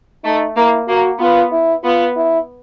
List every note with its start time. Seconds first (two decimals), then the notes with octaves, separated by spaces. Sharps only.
0.24 A3 D#4
0.57 A#3 E4
0.87 A#3 F#4
1.20 B3 F4
1.52 E4
1.84 B3 F4
2.16 E4